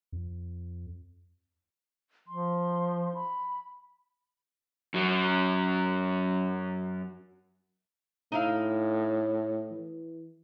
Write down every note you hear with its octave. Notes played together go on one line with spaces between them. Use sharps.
F2
F3 C6
B5
F#2 F#3
A2 D#4 E4 F5
E3